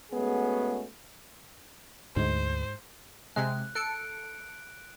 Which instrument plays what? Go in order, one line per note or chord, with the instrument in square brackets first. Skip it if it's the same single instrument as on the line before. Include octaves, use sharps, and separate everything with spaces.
[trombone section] G#3 A3 B3 C#4 F#4 G#4
[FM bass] D2 [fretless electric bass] G#2 G#3 [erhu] C5
[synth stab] C3 G#3 [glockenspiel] F#6
[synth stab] A4 C#7 [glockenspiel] F#6 D7